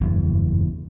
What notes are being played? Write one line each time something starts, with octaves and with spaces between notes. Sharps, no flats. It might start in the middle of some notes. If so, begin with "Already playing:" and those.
F#1 E2 G2